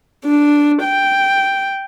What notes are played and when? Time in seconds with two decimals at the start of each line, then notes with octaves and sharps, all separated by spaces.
0.25 D4
0.83 G5